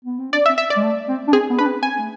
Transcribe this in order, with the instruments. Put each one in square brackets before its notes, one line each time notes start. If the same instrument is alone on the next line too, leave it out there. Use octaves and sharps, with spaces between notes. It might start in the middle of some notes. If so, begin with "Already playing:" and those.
[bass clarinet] B3
C4
[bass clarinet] D4 [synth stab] D5
[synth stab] E5
[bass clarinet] C4
[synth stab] E5
D5
[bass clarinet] G#3
A3
C4
D4
[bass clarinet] C4 [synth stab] G#4
[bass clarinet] B3
[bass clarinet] D4 [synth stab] B4
[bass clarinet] C4
[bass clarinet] C4 [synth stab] G#5
[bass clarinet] A3